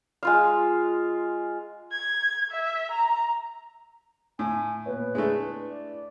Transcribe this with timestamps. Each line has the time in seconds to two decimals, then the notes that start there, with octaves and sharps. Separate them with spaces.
0.23 G#3 F4 F5
1.92 G#6
2.51 E5
2.91 A#5
4.39 A2 G#5
4.86 A#2 B3 B4 C#5
5.15 G#3 A3 D4 E4
5.70 D5